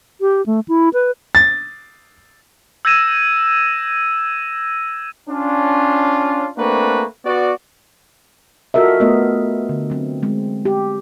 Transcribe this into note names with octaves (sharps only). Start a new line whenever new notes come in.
G4
A3
E4
B4
A6
E6 G6 G#6 A#6 D#7 E7
C#4 D4 F4
A3 A#3 C4 D4 F#4 B4
B3 F#4 D5
F4 F#4 A4 A#4 D#5 E5
A3 B3 A#4 D#5
D3
F#3 C4
G#3 C4
G4